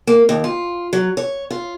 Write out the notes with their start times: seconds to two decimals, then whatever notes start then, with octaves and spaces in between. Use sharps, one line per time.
0.07 A#3
0.29 D#2
0.44 F4
0.93 F#3
1.17 C#5
1.51 F4